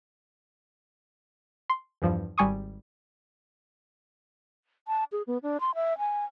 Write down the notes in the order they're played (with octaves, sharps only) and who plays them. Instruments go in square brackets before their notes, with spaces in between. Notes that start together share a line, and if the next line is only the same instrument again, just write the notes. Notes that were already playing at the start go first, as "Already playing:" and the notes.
[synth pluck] C6
E2 G2 F3
G#1 G3 G#5 C#6 D#6
[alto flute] A5
G#4
B3
D4
C6
E5
G#5